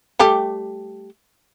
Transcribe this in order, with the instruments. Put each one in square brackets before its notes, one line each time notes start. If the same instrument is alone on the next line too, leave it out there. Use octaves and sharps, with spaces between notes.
[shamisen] G3 A3 G4